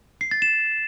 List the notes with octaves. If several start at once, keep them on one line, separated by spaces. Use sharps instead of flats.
C7
A6
E7